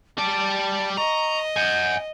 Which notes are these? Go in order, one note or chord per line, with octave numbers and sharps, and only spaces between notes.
G3 D5 A5
D#5 A#5 C#6
F#5 G#5 G6